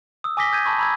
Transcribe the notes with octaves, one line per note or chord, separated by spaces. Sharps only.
D#6 E6
G#5 D6 D#6 A#6 B6 G7
D#6 G6 G#6 D#7
A5 B5 C#6 G#6
A#5 B5 E6 G#6